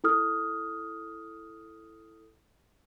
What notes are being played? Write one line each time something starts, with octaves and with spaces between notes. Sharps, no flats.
E4 A4 D#6 F6